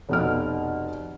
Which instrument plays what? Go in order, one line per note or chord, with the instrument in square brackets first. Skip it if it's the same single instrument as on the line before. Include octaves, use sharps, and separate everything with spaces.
[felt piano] F1 B2 F6